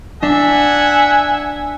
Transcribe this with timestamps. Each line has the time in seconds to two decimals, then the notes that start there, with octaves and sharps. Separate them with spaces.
0.23 D4 E5 F#5 G#5